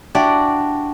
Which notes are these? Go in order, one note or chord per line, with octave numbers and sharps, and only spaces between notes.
D4 E4 F#4 G4 D5 D6